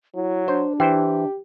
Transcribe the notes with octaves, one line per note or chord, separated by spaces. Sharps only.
F#3 E4
D4 C5
E3 G4 C5 G5